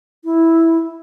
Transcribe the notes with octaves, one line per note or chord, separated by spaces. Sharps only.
E4